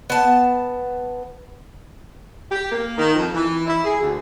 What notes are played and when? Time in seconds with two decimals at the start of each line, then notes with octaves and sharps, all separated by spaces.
0.10 B3 A5
2.51 G4
2.71 A#3
2.98 D#3
3.14 F2
3.34 E3
3.67 E4
3.83 G#4
4.01 D2